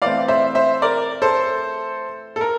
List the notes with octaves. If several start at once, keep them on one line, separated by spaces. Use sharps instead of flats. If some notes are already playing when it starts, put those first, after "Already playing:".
E3 A3 C4 D5 F5
C5 E5
C5 E5
A#4 D5
A4 C5
A4
A#4